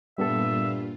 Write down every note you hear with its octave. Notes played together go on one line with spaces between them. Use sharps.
G2 A#2 G3 B3 F4 A4 E5